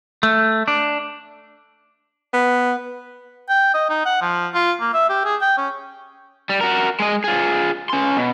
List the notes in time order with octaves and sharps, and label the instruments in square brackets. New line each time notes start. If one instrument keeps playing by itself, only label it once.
[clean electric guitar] A3
D4
[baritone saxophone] B3
[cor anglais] G5
D#5
D#4
F#5
F3
F4
A#3
E5
G4
G#4
G5
C#4
[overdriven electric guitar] G3
F#4 A#4
G#3 D#5
F4 G#4
C#4 C6
B2